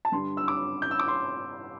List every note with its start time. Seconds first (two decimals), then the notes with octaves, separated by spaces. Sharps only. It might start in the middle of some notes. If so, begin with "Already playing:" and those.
0.05 A5
0.12 G2 D3 G3 C6
0.37 E6
0.48 D6
0.82 G6
0.91 E6
0.99 D6
1.08 C6